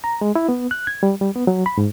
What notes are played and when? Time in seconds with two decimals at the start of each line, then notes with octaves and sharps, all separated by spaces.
0.04 A#5
0.21 G#3
0.35 E4
0.49 B3
0.71 F#6
0.87 G#6
1.03 G3
1.21 G3
1.35 B3
1.47 F#3
1.66 B5
1.78 G#2